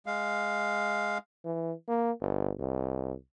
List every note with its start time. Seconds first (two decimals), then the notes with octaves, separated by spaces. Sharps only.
0.06 G#3 F5
1.45 E3
1.88 A#3
2.21 G1
2.59 C2